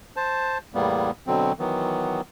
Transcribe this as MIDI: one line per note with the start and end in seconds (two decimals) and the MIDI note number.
0.16 0.58 72
0.16 0.58 81
0.75 1.11 40
0.75 1.11 45
0.75 1.11 55
0.75 1.11 58
0.75 1.11 59
1.27 1.52 47
1.27 1.52 50
1.27 1.52 54
1.27 1.52 60
1.59 2.21 51
1.59 2.21 52
1.59 2.21 54
1.59 2.21 59